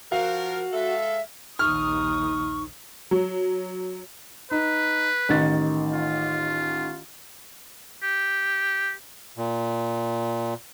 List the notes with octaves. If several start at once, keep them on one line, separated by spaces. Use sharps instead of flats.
F3 F#4 A#4 F5
G#3 A4 E5
A#1 D#2 D#4 C#6 D#6 F6
F#3
D#4 B4
A1 D#3 A6
F4
G4
A#2